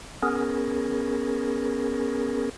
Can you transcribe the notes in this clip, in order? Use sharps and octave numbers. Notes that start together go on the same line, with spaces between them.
B3 C#4 G#4 A#4